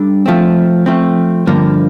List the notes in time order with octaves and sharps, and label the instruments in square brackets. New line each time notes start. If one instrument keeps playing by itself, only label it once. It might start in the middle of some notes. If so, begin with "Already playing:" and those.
Already playing: [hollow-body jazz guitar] G3 D4 A4
F3 A3 C4
F3 A3 C4
G2 D3 F3 A#3